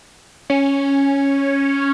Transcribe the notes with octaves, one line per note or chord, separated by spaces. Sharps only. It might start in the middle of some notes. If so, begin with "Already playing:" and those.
C#4